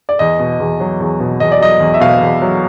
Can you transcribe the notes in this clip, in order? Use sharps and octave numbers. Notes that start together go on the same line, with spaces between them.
D5
E2 D#5
B2
E2
F#3
E2
B2
E2 D#5
D5
F#3 D#5
E2
E5
B2 F5
E2
F#3